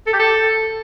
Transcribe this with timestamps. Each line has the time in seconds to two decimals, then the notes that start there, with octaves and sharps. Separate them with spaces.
0.07 A4
0.13 G4
0.19 A4